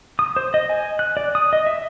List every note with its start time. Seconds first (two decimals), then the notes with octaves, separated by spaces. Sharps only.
0.19 D#6
0.36 C5
0.54 D#5
0.69 G#5
0.99 F#6
1.17 D5
1.35 D#6
1.53 D#5
1.67 E5